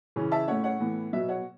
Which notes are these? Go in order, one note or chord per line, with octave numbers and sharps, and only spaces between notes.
C#3 E3 C#4
E5 A5
A2 A3 C#4 C#5 F#5
C#5 F#5
A2 E3 B3
B2 F#3 B3 E5
C#5 F#5